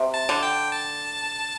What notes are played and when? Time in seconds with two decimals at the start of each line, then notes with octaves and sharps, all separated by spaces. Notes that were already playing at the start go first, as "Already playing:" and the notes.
Already playing: C3
0.14 A5
0.29 D3
0.43 G5
0.71 A5